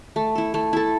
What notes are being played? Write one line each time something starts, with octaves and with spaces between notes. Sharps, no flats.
A3
E4 A4
A3
E4 A4